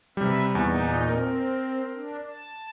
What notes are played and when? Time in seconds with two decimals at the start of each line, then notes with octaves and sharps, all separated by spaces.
0.17 C3 G3 C4 B4 E5
0.55 E2 A#2 D#4
1.09 C4 A#4
1.94 D4
2.29 A5